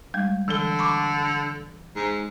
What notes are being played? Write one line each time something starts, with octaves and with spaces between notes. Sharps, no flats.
G3 G#3
D3 E3 A4
B5 C#6 D6
G#2